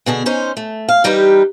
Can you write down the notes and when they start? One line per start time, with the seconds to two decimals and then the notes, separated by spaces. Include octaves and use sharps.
0.06 B2 D3 G#4
0.26 C#4 D#4 C5
0.57 A3
0.88 F5
1.04 E3 G3 D#4 G4 A#4 B4